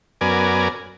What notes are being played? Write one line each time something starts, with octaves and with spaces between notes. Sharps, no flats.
F#2 B3 A#4 D5 G#5